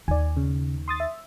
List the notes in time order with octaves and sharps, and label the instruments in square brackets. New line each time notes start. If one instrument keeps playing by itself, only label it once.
[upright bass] D#2 D#4 [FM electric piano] D5 G#5
[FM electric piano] C#3
C6 D#6 A6
E5